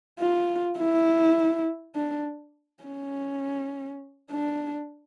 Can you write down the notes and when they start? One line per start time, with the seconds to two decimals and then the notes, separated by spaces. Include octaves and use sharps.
0.19 F4
0.78 E4
1.96 D4
2.83 C#4
4.31 D4